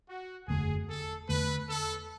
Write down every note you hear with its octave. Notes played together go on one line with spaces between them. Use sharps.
F#4
F#1 E2 D3 A3 G#4
A4
E2 D3 A3 B4
A4